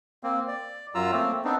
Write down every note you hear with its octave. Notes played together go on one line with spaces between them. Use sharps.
A#3 C4
D5
F#2 F#3 F4 A#5 E6
A3 A#3 C4
B3 C4 D4 D#4